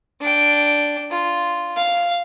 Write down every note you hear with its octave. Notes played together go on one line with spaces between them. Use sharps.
D4 G5
F4
F5